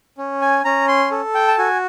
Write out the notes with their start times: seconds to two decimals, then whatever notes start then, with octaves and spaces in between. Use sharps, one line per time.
0.18 C#4
0.41 G#5
0.65 C#4 A#5
0.88 C6
1.11 A4
1.35 G5
1.48 A5
1.58 F#4 G#5